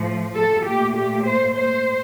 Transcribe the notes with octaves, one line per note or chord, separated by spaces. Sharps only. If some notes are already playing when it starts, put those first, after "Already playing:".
Already playing: A2 F3 A3
A4
A#2 A3 G4
G4
C5
C5